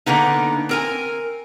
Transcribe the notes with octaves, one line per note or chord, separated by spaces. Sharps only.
D3 A#3 B3 D#4
C4 A#4 G#5